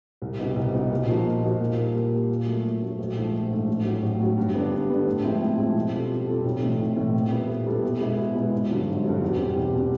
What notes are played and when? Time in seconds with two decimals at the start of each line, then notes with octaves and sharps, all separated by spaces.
0.22 C2
0.39 B2 G3 B3 D#4
0.56 C2
0.74 B2 G3 B3 D#4
0.91 A#2
1.08 F3 A#3 D#4 F#4
1.26 A#2
1.43 F3 A#3 D#4 F#4
1.60 A#2
1.77 G3 A#3
1.95 A#2
2.13 G3 A#3
2.30 A#2
2.47 F#3 A3
2.64 A#2
2.81 F#3 A3
2.99 A#1
3.16 G#2 F3 A3
3.33 A#1
3.51 G#2 F3 A3
3.68 A1
3.85 A2 F#3
4.03 A1
4.20 A2 F#3
4.37 G2
4.55 D3 G3 B3 D4
4.71 G2
4.89 D3 G3 B3 D4
5.06 A2
5.24 F3 G#3 C4 E4
5.41 A2
5.58 F3 G#3 C4 E4
5.75 B2
5.93 G3 C4 F4 A4
6.10 B2
6.27 G3 C4 F4 A4
6.44 B1
6.62 A2 E3 A3 C4
6.80 B1
6.97 A2 E3 A3 C4
7.14 A#2
7.32 G3 B3 E4 A4
7.49 A#2
7.66 G3 B3 E4 A4
7.83 B2
8.00 G#3 B3 E4
8.18 B2
8.35 G#3 B3 E4
8.53 G#1
8.70 G2 D3 F#3
8.87 G#1
9.04 G2 D3 F#3
9.21 E2
9.38 B2 G3 C4
9.57 E2
9.73 B2 G3 C4